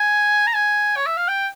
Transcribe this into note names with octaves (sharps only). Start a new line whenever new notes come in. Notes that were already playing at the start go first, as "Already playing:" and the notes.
Already playing: G#5
A#5
G#5
C#5
E5
F5
G5